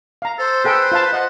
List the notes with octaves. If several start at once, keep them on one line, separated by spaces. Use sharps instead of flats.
F5 A#5
A4 C5
G#4 A4 B4 G5
F4 F5 A5
D#5 F#5